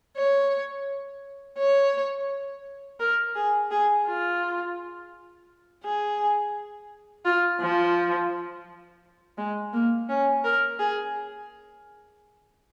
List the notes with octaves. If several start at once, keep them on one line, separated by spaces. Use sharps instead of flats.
C#5
C#5
A#4
G#4
G#4
F4
G#4
F4
F3
G#3
A#3
C#4
A#4
G#4